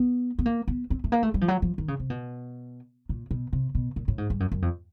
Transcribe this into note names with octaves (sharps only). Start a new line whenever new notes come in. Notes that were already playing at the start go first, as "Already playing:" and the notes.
Already playing: B3
B3
A#3
B3
C4
A3
A#3
A3
G3
F3
F#3
F3
D#3
C#3
C3
B2
A#2
B2
C3
B2
A#2
A2
G#2
G2
F#2
F#2
F2